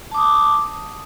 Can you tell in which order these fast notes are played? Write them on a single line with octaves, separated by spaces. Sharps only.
A5 D6 D#6